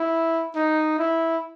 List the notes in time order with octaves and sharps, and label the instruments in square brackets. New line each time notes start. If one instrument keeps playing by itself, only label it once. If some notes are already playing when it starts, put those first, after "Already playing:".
Already playing: [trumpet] E4
D#4
E4